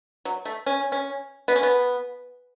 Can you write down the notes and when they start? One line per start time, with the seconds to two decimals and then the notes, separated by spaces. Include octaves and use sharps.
0.25 F#3
0.45 A3
0.66 C#4
0.92 C#4
1.48 B3
1.56 C#4
1.63 B3